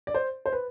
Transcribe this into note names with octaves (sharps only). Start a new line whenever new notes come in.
D5
C5
C5
B4